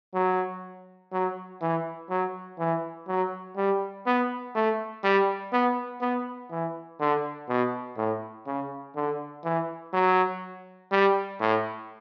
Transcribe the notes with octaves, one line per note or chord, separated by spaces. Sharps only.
F#3
F#3
E3
F#3
E3
F#3
G3
B3
A3
G3
B3
B3
E3
D3
B2
A2
C#3
D3
E3
F#3
G3
A2